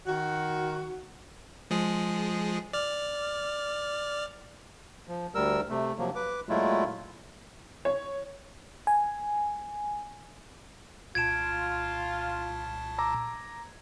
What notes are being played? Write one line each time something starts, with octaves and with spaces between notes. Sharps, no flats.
D#3 F#4
F3 G#3 G#4
D5 F6
F3
D2 G3 A#4 E6
C3 A3
C3 F3 F#3 A#3
B4 D6
A#2 F#3 G#3 A3 E4 F4
C#5
G#5
C2 A#2 F4 A5 G#6 D7 E7
A#5 D6 E6